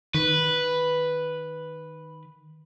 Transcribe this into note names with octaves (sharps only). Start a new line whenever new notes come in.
D#3 B4